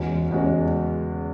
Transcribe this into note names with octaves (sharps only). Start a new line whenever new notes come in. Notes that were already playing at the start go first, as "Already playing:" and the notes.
Already playing: E2 C#3 G#3 C#4 F#4
E2 C#3 G#3 C#4 F#4